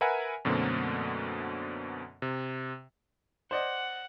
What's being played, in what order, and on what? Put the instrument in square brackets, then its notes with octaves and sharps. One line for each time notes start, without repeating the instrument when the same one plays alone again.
[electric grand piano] A#4 B4 E5 F#5 G#5
F#2 B2 D3 A3 A#3 C4
C3
[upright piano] C5 D5 D#5 [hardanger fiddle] F#5